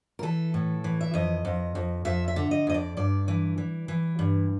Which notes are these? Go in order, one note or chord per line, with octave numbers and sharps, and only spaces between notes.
A#4
E3 A4
A2
E3
E5
F2 D#5
F2
F2
F2 E5
E5
D3
D#5
F2 D#5
D5
G2 D5
E3
E3
E3
G2